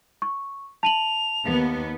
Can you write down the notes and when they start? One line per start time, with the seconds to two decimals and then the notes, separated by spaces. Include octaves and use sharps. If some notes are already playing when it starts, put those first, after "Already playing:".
0.22 C#6
0.83 A5 D#7 F7 F#7
1.45 D#2 B3